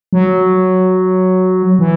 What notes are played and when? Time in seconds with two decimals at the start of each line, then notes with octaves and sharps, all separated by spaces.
0.13 F#3
1.79 E3